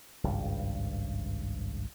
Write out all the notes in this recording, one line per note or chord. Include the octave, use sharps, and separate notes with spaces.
G#1 C#2 G2